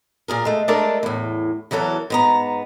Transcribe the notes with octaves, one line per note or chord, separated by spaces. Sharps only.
A#2 G#4 A#4
G#3 A3
G#3 A3 D4 A4 A#4 D5
E2 A2
E2 E3 F#3 A4 A#4
G#2 B3 A#5